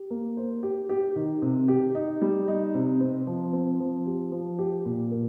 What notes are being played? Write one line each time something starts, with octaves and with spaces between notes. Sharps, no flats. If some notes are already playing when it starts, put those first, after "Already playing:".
Already playing: G4
A#3
C5
G4
G4
D#3
C3
G4
D#4
G3
D#4
C3
C4
F3
C4
F3
G4
F3
G4
A#2
A#4